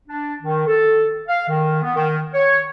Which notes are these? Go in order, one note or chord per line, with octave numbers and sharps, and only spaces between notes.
D4
D#3
A4
F5
D#3
B3
D#3
C#5